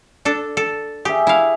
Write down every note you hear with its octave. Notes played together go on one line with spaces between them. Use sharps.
D4 A4
A4
G4 G#4 E5
E4 F5